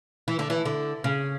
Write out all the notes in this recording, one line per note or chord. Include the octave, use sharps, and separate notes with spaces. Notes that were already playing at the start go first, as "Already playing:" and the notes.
E3
D3
E3
D3
C#3